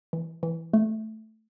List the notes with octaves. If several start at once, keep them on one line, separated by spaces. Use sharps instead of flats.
E3
E3
A3